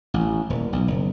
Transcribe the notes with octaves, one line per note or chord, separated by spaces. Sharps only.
A1
D#1
B1
F#1